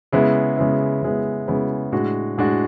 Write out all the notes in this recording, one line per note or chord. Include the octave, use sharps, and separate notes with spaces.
C#3 G#3 B3 E4
C#3 G#3 B3 E4
C#3 G#3 B3 E4
C#3 G#3 B3 E4
A2 G#3 D4 F#4
A2 G#3 D4 F#4